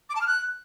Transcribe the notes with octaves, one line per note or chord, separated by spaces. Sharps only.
D6
A5
F6
F#6